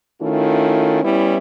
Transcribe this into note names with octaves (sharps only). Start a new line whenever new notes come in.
D#3 A3 C#4 E4 F4
G3 B3 C#4 E4